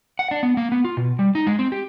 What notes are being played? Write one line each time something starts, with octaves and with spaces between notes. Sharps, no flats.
F#5
D4
B3
A#3
B3
F4
B2
G3
D#4
G#3
C4
G4